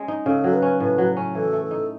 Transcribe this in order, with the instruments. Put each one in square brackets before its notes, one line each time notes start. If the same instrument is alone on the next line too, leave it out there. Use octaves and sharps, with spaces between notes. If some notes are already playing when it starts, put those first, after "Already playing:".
Already playing: [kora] G#3 C#4
D#4
[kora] C#3 [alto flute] A4
[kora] F#3 [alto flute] A4
[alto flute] B4
[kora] C#4
[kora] A2 [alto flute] B4
[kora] F#3
C#4
[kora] E3 [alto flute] A4
[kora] A3
[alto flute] A4
[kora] D#4